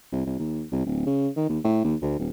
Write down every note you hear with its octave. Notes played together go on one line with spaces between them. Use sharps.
C2
C2
D#2
C2
D1
C#3
D#3
D#2
A2
D#2
D2
D#1